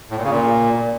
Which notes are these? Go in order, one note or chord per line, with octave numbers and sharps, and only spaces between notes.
A2
A#2
C#3
A#2